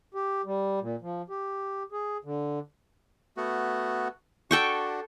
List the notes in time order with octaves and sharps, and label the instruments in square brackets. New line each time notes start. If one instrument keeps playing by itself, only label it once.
[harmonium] G4
G3
A#2
F3
G4
G#4
D3
[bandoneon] A3 B3 F#4
[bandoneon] D4 F#4 [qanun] A4 G5 C#6